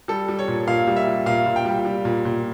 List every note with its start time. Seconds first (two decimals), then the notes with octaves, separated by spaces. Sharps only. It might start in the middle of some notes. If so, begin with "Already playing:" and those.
0.08 G3 A4
0.28 G3
0.39 C#5
0.48 A#2
0.68 A#2 F5
0.87 G3
0.96 E5
1.07 G3
1.26 A#2 F5
1.46 A#2
1.56 G5
1.65 G3
1.85 G3
2.05 A#2
2.25 A#2